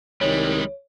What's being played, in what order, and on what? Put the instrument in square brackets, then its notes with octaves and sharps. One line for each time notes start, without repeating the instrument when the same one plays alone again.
[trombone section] C2 D#3 [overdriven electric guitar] G3 G#3 [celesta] C#5